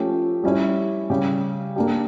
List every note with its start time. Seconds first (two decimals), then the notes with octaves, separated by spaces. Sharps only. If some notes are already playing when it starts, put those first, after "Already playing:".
Already playing: F3 A3 C#4 G4
0.43 G3 C#4 E4
1.10 C#3 G3 C#4 G4
1.76 A#3 D4 G4